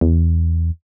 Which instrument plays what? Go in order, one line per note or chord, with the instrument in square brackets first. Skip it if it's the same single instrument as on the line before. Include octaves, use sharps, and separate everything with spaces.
[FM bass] E2